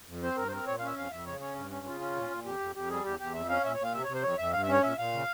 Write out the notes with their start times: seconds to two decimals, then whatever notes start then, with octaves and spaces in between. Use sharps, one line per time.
0.08 F2
0.23 C4 C5
0.37 G2 A#4
0.48 C5
0.52 C4 A#4
0.67 A#2 C#5
0.79 F5
0.82 C#4 E5
0.96 F2 F5
1.11 F2 E5
1.26 C#3 C#5
1.41 C#4 C#5
1.56 G2
1.71 C#4
1.86 C#3 F4
2.00 C#4
2.16 A#2
2.30 A#2
2.45 F2 G4
2.60 F2
2.76 F2 G4
2.89 G3 G#4
3.04 E2 G4
3.20 E2 G4
3.34 F2 E5
3.49 C#4 F5
3.64 A#2 E5
3.74 C#5
3.79 A#2 F5
3.93 C3 E5
4.04 C#5
4.08 C3
4.14 C5
4.23 F2 C#5
4.38 F2 E5
4.53 G2 F5
4.63 E5
4.68 C#4 C#5
4.83 A#2 E5
4.97 A#2 F5
5.13 C#3